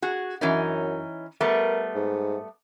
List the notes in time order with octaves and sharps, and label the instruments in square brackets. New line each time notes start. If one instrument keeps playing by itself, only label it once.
[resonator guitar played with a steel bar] F#4 G#4
[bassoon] F#2 [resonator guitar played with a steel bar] E3 C#4 D#4
[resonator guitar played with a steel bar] G3 A3 B3 [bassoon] A#4
[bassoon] G#2